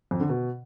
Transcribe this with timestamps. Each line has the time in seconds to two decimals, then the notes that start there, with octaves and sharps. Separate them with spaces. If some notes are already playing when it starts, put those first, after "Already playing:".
0.11 F2
0.20 D3
0.29 B2